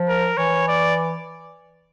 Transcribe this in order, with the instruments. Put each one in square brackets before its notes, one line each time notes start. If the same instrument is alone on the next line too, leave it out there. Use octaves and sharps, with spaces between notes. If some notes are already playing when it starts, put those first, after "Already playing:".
Already playing: [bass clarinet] F3
[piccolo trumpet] A#4
[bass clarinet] E3 [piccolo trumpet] C#5
[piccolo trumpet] D5